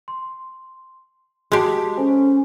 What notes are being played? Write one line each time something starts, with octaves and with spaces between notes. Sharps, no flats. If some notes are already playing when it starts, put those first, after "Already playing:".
C6
G#3 F#4 G4 A5 B6
C#4 A4 C5 G#5